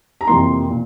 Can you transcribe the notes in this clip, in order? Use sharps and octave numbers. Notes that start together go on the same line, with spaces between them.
A#5
F2 C3 E3 A#3 C6
A#2